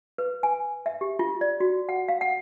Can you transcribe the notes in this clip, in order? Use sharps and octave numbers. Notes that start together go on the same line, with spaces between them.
B4
G#5
E5
G4
F4
D5
F#4
F#5
F5
F#5